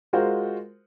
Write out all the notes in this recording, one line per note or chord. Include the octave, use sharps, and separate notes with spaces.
G#3 F4 F#4 A#4 C5